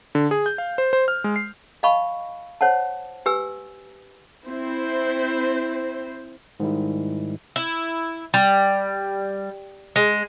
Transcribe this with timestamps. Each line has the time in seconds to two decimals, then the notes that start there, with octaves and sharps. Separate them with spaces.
0.15 D3
0.31 G#4
0.46 G6
0.58 F5
0.78 C5
0.93 C5
1.08 F6
1.24 G#3
1.36 C7
1.83 D#5 F5 A5 B5 C#6
2.61 C5 C#5 F#5 A5
3.26 G4 B4 G#5 E6
4.46 C4 E4 C5
6.60 G#2 D#3 G3 E4
7.56 E4
8.34 G3
9.96 G#3